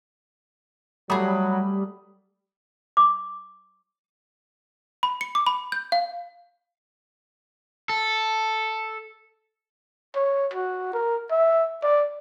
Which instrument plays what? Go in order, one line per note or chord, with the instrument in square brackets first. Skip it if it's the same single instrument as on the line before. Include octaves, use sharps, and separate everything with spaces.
[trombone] F#3 [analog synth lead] G3 [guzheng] A3 G#4 [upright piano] B5 D#6
[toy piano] D6
[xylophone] B5
C#7
D6
B5
G6
F5
[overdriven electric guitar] A4
[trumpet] C#5
F#4
A#4
E5
D5